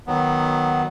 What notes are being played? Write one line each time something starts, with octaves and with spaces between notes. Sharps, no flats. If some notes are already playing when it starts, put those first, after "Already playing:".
D#3 F#3 B3